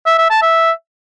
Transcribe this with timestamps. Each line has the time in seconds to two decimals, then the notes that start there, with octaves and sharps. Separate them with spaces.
0.06 E5
0.18 E5
0.30 A5
0.42 E5